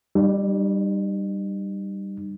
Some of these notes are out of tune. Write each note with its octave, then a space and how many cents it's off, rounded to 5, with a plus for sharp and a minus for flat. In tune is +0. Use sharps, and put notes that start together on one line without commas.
G3 +0 D#4 -45